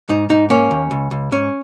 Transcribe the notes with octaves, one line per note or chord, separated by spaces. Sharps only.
G#2 D#4
G#2 D#4
A#3 C#4
D#2
C#2
C#2
G#2 C#4